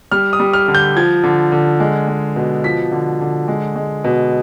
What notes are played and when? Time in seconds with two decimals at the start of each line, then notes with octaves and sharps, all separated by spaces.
0.12 G3 F6
0.33 D#6
0.40 G3
0.53 F6
0.68 D3
0.75 G6
0.97 F3 G#6
1.24 D3
1.52 D3
1.80 G#3
2.08 G#3
2.36 B2
2.64 F3 B6
2.92 D3
3.21 D3
3.48 G#3
3.76 G#3
4.04 B2